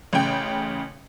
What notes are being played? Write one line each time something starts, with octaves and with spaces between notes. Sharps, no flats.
A1 C#3 G5